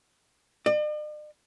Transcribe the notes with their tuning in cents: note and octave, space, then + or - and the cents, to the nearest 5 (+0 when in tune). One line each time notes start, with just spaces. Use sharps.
D5 +45